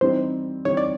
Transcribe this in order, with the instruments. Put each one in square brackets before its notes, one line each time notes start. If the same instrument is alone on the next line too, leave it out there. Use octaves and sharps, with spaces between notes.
[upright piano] E3 G3 C4 D#4 [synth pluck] C5
[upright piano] E3 G3 C4 D#4 [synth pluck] C#5
[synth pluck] D5